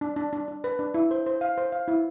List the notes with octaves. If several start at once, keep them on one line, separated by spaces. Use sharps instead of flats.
D4
D4
D4
D4
B4
D4
E4
C5
C5
F5
C5
F5
E4